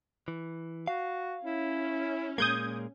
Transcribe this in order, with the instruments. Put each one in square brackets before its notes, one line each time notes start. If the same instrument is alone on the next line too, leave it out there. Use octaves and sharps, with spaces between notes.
[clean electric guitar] E3
[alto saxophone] F#4 [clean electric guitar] F5
[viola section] C#4 [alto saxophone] E4
[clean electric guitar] A#2 G#3 A#3 [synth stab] D#6 G6 G#6